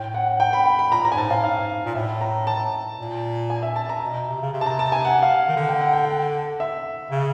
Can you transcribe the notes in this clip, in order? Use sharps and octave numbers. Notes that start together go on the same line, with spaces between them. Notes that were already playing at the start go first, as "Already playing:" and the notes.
Already playing: A2 G5
F#5
G5
B5
B5
B5
A#2 A#5
A2 A#5
G#5
G#2 A5
A2 F5
G#2 F5
A#2
A2 E5
A#5
A5
A#2
G#5
E5
A5
A#5
B2
C3
C#3
C3
A5
A#5
A5
G#5
F#5
F5
D#3
D3 F#5
G5
F#5
G5
F#5
E5
C#3